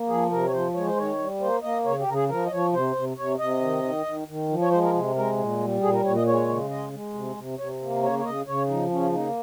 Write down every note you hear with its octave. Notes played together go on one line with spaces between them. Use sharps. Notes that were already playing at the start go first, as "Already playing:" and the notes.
Already playing: A#3
F3 G#4
C3 A#4
C#5
F3 C5
G#3 C#5
C5
D#3 C#5
G3
A#3 C5
A#3 D#5
C#3 C#5
G4
C#3 A#4
G#4
F3 A#4
D#5
F3 C#5
C3 C5
C3
C3 C#5
C3 D#5
D#3
D#3
D#3
D#3
F3
C#5
G#3 C5
A#4
C3
G#3 A#4
A#2
G3
A#2 G#4
A#4
A#2 C#5
D#5
G#3 C#5
C#3
G#3 D#5
G#3
C3
C3
C3 C#5
A#3
C#3 C#5
C#5
C#3 D#5
C#3 C#5
F3 D#4
C#3 C#4
A#3 D#4